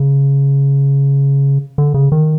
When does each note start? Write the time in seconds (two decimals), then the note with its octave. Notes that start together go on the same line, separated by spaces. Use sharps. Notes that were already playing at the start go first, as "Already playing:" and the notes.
Already playing: C#3
1.78 D3
1.94 C#3
2.12 D#3